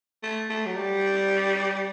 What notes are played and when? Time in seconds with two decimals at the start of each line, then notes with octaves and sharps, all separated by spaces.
0.23 A3
0.50 A3
0.66 F#3
0.76 G3